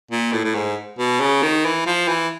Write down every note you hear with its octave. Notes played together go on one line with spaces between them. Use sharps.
A#2
A2
A2
G#2
B2
C#3
D#3
E3
F3
E3